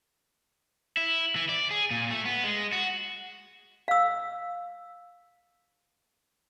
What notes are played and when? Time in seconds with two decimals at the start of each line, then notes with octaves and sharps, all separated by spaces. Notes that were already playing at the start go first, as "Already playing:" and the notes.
0.97 E4
1.36 E3
1.49 D5
1.71 G#4
1.91 A#2
2.11 A3
2.25 B3
2.44 G#3
2.73 F#4
3.88 F5 E6